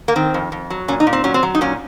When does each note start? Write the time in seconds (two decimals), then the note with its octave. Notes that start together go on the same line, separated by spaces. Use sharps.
0.08 A#3
0.16 D#3 C4
0.34 F2
0.52 F2
0.70 F#3
0.88 A#2 C#4
1.00 D#4
1.07 A#2
1.13 C4
1.24 F#3 C#4
1.34 C4
1.43 F#3
1.55 D#4
1.61 A#2 C#4